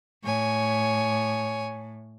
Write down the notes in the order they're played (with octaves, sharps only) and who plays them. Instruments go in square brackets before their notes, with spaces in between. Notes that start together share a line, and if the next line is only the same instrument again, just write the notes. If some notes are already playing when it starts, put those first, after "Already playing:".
[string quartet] A2 [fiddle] C#5 G#5